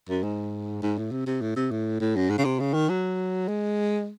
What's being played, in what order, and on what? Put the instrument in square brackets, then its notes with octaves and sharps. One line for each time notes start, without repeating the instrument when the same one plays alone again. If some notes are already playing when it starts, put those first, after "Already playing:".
[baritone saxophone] F#2
G#2
G#2
A2
C3
C3
A2
C3
A2
A2
F#2
G#2
C#3
C3
C#3
D#3
F#3
G#3